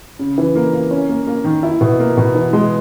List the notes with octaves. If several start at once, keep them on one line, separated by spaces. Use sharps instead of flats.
C#3
E3
A#3
A#3
C#4
A#3
A#3
D#3
E4
B2
A#3
B2
E3
G#3